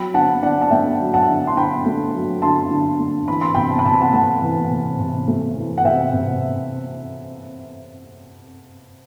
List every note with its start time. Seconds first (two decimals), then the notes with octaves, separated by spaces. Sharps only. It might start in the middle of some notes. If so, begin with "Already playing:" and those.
Already playing: F#3 G5 B5
0.14 D3 F#5 A5
0.42 D3 D5 F#5
0.61 A5
0.71 A3 E5 G5
1.00 F#3
1.14 F#5 A5
1.29 D3
1.47 C6
1.56 D3 G5 B5
1.86 A3
2.14 F#3
2.42 D3 A5 C6
2.71 D3
2.99 A3
3.28 E3 B5
3.41 C6
3.54 C3 G5 B5
3.71 A5
3.79 B5
3.86 C3 A5
3.94 B5
4.01 F#5 A5
4.13 A3 F#5 A5
4.42 E3
4.71 C3
4.99 C3
5.28 A3
5.57 E3
5.78 F#5
5.84 C3 E5 G5
6.13 C3